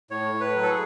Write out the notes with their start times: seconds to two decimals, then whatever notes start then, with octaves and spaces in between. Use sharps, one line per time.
0.11 A2 C#5
0.33 A2
0.40 B4
0.55 F#3
0.62 A4
0.70 G#4